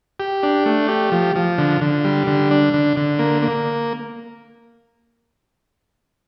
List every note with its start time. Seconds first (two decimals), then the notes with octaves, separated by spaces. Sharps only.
0.20 G4
0.43 D4
0.66 A3
0.88 G4
1.12 F3
1.36 F3
1.58 D3
1.81 D3
2.05 G3
2.27 D3
2.51 D4
2.74 D3
2.97 D3
3.19 A#3
3.42 A#3